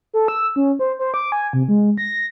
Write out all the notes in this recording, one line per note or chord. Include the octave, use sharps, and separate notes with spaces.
A4
E6
C#4
C5
C5
D6
G#5
C3
G#3
A#6